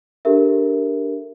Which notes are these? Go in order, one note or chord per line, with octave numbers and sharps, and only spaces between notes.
D4 G4 A4 A#4 E5